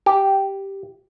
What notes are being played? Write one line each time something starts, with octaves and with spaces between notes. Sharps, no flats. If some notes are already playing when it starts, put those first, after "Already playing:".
G4